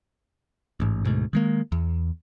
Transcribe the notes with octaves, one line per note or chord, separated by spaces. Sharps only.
A1 G#2
D2 G#2 B2
D#3 G#3 A#3
E2